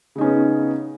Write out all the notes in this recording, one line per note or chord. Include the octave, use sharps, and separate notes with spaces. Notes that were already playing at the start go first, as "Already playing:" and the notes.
C#3 B3 C#4 D#4